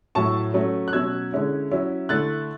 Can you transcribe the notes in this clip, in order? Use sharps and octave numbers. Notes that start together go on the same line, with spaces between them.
A2 F#3 A3 E4 A5 C#6
F#3 A3 C#4
F#6
B2 F#3 C#4 E6 G#6
D3 G#3 C#4 E4
F#3 C#4 E4
D3 A3 E4 F#6 A6